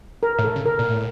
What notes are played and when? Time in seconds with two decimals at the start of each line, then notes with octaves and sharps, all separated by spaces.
0.23 A#4
0.38 A2
0.44 A4
0.56 C#3
0.66 A#4
0.79 A#2
0.87 A2